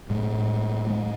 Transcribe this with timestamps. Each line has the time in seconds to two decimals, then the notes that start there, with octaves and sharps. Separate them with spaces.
0.10 A2 G#3
0.90 G#3